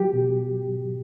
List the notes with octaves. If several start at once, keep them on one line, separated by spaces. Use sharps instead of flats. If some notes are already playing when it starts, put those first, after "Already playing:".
Already playing: F#3 G4
B2